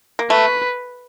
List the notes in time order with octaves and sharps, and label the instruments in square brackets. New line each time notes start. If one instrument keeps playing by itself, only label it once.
[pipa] A#3
[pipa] A3 [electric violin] B4